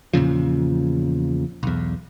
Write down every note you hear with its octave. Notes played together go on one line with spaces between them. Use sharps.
E2 A#2 C#3 F3
B1 E2